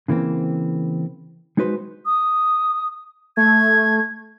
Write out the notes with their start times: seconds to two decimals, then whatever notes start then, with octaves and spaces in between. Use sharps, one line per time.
0.08 C#3 E3 A#3 C4
1.57 G#3 D#4 F#4 B4 C5
2.06 D#6
3.37 A3 G#6